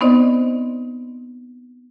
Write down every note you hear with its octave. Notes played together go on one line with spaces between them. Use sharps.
B3 C4 D#4 C5 D5 D#5